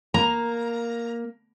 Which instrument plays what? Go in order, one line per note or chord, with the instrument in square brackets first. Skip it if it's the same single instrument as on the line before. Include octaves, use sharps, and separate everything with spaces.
[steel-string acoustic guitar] A#3 [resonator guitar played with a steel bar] A#5